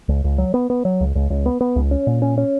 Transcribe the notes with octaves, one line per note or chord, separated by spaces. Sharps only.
C#2
C#2
F#3
B3
B3
F#3
C#2
C#2
C#2
B3
B3
C#2
C#4
A#2
C#4
C#4